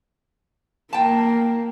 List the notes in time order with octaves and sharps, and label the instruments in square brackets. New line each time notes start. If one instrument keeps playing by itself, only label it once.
[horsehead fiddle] A#3 [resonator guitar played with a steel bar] G5 A5